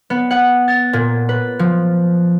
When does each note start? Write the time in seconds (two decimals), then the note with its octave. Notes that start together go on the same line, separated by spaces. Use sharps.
0.10 B3
0.31 F#5
0.68 A6
0.93 A#2
1.29 B4
1.59 F3